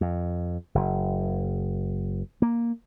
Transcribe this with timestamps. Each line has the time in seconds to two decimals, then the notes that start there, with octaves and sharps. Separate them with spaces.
0.01 F2
0.75 F#1
2.42 A#3